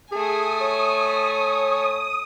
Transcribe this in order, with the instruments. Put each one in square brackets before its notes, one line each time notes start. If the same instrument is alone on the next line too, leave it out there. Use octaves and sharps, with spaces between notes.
[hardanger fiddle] A3 G#5 [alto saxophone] G#4 [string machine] D#6
[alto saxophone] C#5